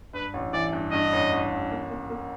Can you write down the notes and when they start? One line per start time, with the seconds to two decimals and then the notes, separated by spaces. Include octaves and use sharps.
0.13 G2 B4
0.34 A1
0.53 E3 D5
0.73 G2
0.92 G2 D#5
1.13 A1
1.32 A1
1.52 A1
1.71 A#3
1.90 A#3
2.10 A#3